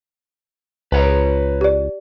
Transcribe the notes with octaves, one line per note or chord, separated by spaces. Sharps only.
C#2 B4 C#5 A#5
G4 D5